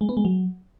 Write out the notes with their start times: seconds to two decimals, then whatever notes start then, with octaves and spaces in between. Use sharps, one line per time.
0.01 G#3
0.09 B3
0.17 G#3
0.25 F#3